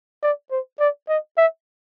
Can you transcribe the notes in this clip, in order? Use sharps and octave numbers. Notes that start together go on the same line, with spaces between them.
D5
C5
D5
D#5
E5